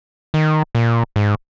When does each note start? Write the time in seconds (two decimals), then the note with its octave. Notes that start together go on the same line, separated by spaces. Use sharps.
0.34 D#3
0.75 A#2
1.16 G#2